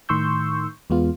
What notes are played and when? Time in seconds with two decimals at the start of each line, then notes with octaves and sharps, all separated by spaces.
0.09 A2 D#3 C6 C#6 E6 G6
0.90 E2 G#3 B3 F4